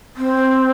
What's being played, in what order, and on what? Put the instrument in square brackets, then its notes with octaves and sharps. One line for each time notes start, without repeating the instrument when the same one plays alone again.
[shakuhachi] C4